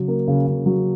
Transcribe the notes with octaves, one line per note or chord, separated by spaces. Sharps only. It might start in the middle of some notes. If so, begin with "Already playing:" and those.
Already playing: C#3 F#3
A#3
C#3
C#3
F#3